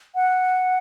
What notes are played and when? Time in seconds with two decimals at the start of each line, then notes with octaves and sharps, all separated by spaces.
0.15 F#5